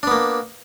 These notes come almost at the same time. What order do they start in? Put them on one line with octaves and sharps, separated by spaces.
D4 B3 A#3